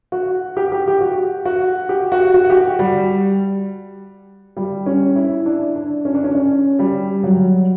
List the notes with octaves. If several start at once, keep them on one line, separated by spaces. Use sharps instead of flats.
F#4
G4
G4
G4
F#4
F#4
G4
F#4
F#4
G4
F#4
G3
G3
C#4
E4
D4
D4
C#4
D4
C#4
C#4
G3
F#3